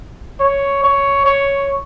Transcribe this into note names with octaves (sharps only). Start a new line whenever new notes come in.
C#5
C#5
C#5